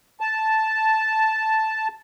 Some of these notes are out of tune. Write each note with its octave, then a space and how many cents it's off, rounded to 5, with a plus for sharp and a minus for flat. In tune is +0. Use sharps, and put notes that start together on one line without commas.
A5 -5